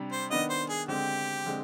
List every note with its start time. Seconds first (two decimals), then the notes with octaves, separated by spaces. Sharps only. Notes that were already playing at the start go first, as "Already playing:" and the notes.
Already playing: C3 G3 D4
0.12 C5
0.30 D#3 B3 D4 D#5
0.50 C5
0.69 G#4
0.88 D3 G#3 C4 G4
1.46 D3 G#3 C4